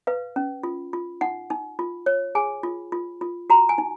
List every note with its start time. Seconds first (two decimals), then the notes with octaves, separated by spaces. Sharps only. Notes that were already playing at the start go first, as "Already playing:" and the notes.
0.07 B4 F5
0.36 C#4
0.63 F4
0.93 F4
1.21 D#4 F#5
1.50 D#4
1.79 F4
2.06 C#5
2.35 G#4 G#5
2.63 F4
2.92 F4
3.21 F4
3.50 F#4 A#5
3.69 G#5
3.78 D#4